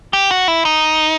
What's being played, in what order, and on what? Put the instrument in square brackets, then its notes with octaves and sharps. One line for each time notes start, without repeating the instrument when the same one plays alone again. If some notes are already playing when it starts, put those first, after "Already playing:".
[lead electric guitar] G4
F#4
E4
D#4